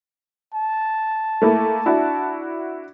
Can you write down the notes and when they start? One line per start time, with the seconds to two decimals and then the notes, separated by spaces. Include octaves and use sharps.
0.54 A5
1.42 A3 A#3 E4
1.86 D4 E4 F#4